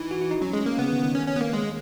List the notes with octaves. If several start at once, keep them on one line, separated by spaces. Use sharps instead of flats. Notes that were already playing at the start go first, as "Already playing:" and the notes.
Already playing: E3 D#4
F#4
E4
D#4
F#3 C#4
G#3
A#3
C#3 B3
D#3
D#3
C#4
C#4
B3
A#3
G#3